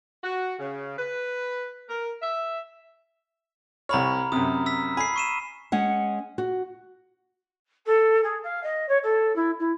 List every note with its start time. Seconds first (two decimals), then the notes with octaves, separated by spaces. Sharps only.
0.24 F#4
0.59 C#3
0.97 B4
1.88 A#4
2.22 E5
3.89 C2 C#5 A#5 B5 F6
4.32 F#2 C3 D#6
4.66 E6 B6
4.97 G#5 B5 C7
5.16 C#6 D#7 E7
5.72 G#3 C#4 F#5
6.38 F#4
7.86 A4
8.23 G#4
8.43 F5
8.63 D#5
8.88 C#5
9.03 A4
9.35 E4
9.59 E4